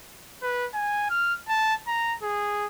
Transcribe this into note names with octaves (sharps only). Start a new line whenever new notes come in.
B4
G#5
F6
A5
A#5
G#4